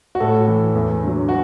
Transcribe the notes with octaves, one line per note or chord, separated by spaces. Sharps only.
F#4
A2 A4
E3
E2
D3 F#3
F#4